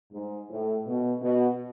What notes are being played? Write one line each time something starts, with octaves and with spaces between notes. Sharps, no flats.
G#2
A2
B2
B2